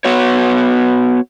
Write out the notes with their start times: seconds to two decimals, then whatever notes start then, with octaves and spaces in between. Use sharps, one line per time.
0.05 B3 F#4 C#5